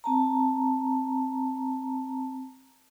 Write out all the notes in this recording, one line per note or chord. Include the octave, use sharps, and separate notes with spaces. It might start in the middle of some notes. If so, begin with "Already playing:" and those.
C4 A5 A#5